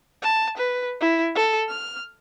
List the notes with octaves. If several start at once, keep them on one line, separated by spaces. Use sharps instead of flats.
A5
B4
E4
A4
F6